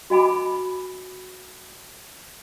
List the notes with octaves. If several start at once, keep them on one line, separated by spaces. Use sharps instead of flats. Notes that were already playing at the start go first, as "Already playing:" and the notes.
F#4 D#5 G#5 B5 D6